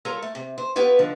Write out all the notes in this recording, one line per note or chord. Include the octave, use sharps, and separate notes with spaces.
G3 F4 A4 A#4 C#5
A3
C3
C5
B3 F4 G4 B4 C#5
D3 D#3 F3